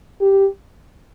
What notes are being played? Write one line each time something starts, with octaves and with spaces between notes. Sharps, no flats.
G4